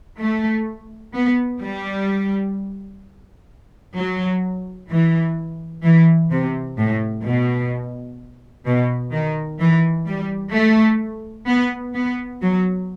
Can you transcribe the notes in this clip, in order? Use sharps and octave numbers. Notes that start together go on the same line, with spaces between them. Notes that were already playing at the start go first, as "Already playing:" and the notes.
A3
B3
G3
F#3
E3
E3
C3
A2
B2
B2
D#3
E3
G3
A3
B3
B3
F#3